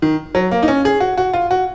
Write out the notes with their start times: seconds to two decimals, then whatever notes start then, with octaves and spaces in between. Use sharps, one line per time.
0.02 D#3
0.35 F#3
0.51 A#3
0.63 D#4
0.68 C#4
0.85 G#4
1.00 F#4
1.18 F#4
1.33 F4
1.51 F#4